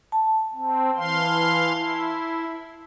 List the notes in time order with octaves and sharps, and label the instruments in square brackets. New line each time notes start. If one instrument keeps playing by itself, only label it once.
[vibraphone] A5
[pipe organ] C4
E3 F5 C6
E4